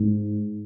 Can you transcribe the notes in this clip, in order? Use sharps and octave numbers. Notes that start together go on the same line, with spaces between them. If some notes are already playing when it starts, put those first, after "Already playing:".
Already playing: G#2